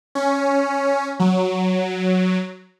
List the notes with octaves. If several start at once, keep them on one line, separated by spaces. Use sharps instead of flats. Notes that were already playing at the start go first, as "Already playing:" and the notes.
C#4
F#3